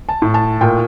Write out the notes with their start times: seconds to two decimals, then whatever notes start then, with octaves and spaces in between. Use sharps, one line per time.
0.09 A5
0.22 A2
0.34 A5
0.61 A#2 G5